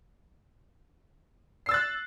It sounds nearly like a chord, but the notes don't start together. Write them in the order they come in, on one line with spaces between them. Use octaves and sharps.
C7 E6 A6 F#6